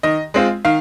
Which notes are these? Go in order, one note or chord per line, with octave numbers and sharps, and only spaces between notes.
D#3 D#5
G#3 C4 F4
D#3 F5